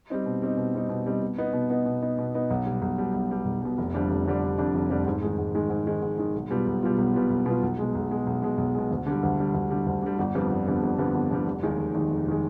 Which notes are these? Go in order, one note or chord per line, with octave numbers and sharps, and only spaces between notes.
G3 C4 D#4
B2
G3 C4 D#4
B2
G3 C4 D#4
B2
G3 C4 D#4
B2
B3 D#4
B2
B3 D#4
B2
B3 D#4
B2
B3 D#4
B1
B2 G3
B1
B2 G3
B1
B2 G3
B1
B2 G3
F1
F2 D3 G3 D4
F1
F2 D3 G3 D4
F1
F2 D3 G3 D4
F1
F2 D3 G3 D4
G#2
D#3 G#3
G#2
D#3 G#3
G#2
D#3 G#3
G#2
D#3 G#3
B1
B2 G3 B3 F4
B1
B2 G3 B3 F4
B1
B2 G3 B3 F4
B1
B2 G3 B3 F4
B1
B2 G#3
B1
B2 G#3
B1
B2 G#3
B1
B2 G#3
D2
D3 G3
D2
D3 G3
D2
D3 G3
D2
D3 G3
G1
F2 D3 G3 B3
G1
F2 D3 G3 B3
G1
F2 D3 G3 B3
G1
F2 D3 G3 B3
F1
D#2 D#3 G#3
F1
D#2 D#3 G#3
F1
D#3 G#3